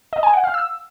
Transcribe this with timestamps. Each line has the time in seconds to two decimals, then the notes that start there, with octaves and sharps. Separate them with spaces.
0.13 D#5
0.23 G#5
0.33 F#5
0.44 F5
0.54 E6